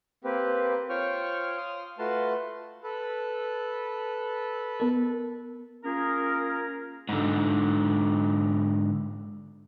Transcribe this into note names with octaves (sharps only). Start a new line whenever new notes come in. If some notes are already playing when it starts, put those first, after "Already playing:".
A#3 C4 G4 B4
F4 C5 C#5 G5 C#6 F6
F5 C6 D#6 F6
A3 F4 F#4 B4 A5 C6
A4 B4
B3 A#4
A#3 C#4 F4 G#4 A#4
G#2 D3